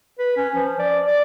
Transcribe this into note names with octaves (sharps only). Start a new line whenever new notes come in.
B4
C#4
F3
D5
D5